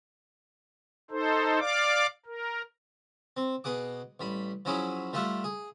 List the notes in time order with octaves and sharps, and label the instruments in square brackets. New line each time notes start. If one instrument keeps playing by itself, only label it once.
[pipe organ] D#4 A4 C5
D5 F5 D6
A#4
[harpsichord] C4
B2 G#4 F#5 D6
A1 G3 B5
F3 F#3 C#4 E4 G#4 B5
G3 A3 F4 G4 E5 F#5
G#4